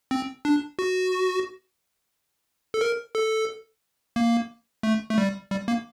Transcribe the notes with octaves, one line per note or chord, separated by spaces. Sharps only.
C4
D4
F#4
A4
A#4
A4
A#3
A3
A3
G3
G3
A#3